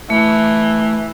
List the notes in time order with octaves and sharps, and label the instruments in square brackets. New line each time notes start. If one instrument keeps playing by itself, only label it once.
[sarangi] E3 [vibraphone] A3